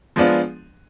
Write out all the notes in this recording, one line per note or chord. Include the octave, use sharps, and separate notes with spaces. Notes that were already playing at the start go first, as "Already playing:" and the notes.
F3 G#3 B3 D4 F4